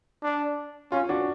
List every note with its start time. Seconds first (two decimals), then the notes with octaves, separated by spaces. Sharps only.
0.23 D4
0.92 C#4 F4
1.09 D4 F#4